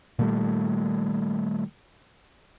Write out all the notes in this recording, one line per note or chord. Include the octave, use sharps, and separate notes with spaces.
A#2 D#3 G3 A3